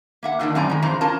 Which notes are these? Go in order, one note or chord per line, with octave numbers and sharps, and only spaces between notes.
A#3 E5 F#5
A#2 D3 D#3 D4
F#2 A2 C4 D5 G#5 A#5
D#3 G#3
F2 C#3 E3 C4 C5 A#5
C#4 F4 A#4 A5 A#5